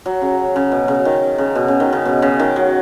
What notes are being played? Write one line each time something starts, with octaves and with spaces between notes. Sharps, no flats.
F#3
C#3
C#3
B2
C#3
D#3
C#3
B2
C#3
D#3
C#3
B2
C#3
D#3
F#3